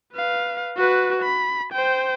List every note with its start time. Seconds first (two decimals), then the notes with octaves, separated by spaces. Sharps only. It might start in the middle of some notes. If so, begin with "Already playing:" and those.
0.13 B4 F5
0.77 F#4 B4
1.22 B5
1.72 C5 G5